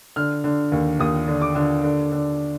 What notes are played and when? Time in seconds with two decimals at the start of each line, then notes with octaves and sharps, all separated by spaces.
0.16 D3 F6
0.44 D3
0.72 D#2
0.99 D#2 D#6
1.28 D3
1.41 D6
1.55 D3
1.84 D3
2.12 D3